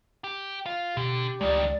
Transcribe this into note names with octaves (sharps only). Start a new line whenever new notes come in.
G4
F4
B2 D3 G4
C#2 G2 D#3 G#3 D5